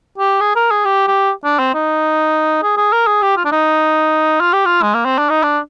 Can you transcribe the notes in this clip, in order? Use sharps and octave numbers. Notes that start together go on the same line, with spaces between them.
G4
G#4
A#4
G#4
G4
G4
D4
C4
D#4
G#4
G#4
A#4
G#4
G4
F4
D4
D#4
F4
G4
F4
G#3
A#3
C4
D4
D#4
D4